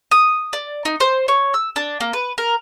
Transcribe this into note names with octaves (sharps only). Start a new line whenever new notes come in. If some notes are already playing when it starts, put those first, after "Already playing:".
D#6
D5
D#4
C5
C#5
E6
D4
A#3
B4
A#4